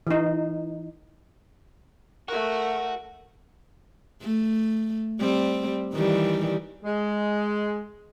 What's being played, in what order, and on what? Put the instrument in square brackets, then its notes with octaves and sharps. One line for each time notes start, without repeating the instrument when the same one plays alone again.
[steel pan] E3 D#4
[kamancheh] A3 A#4 [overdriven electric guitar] F#4
[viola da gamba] A3
G3 C4
D#3 E3 G3
[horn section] G#3